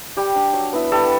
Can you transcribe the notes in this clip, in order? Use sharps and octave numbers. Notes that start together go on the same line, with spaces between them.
G3 G4
D4
F#3
B3 E4
G3 A4